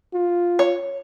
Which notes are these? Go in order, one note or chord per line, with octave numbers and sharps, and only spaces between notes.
F4
C#5